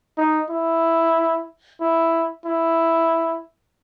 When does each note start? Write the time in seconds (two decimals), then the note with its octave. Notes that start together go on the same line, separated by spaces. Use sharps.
0.18 D#4
0.50 E4
1.81 E4
2.46 E4